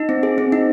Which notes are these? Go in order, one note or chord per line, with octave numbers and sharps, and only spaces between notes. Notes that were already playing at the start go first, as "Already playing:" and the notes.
Already playing: D#4
C4
G#4
C4
D#4